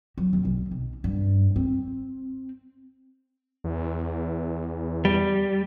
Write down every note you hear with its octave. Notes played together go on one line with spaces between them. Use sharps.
F#3
D#2
B1
B1
G2
C4
E2
G3